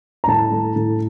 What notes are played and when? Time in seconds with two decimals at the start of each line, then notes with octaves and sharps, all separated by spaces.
0.24 A#5
0.28 A2 A5
0.51 A3
0.76 A2